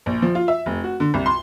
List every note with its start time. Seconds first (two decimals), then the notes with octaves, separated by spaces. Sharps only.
0.06 A#1
0.22 F3
0.35 F4
0.48 E5
0.66 F1
0.84 F#4
1.00 D3
1.14 C2
1.26 C6